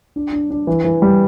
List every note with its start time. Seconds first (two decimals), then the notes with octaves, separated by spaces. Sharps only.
0.16 D4
0.33 D4
0.51 D4
0.67 E3
0.84 E3
1.02 G3